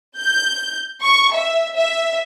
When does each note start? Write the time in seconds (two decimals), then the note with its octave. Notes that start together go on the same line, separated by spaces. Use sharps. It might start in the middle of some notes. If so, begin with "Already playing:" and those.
0.18 G6
1.02 C#6
1.34 E5
1.76 E5